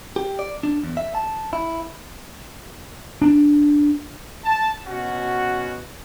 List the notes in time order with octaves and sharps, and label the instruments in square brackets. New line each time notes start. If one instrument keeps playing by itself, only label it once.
[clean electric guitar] G4
D5
D4
E2
E5
A5
E4
[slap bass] D4
[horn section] A5
B2 C#4 F#4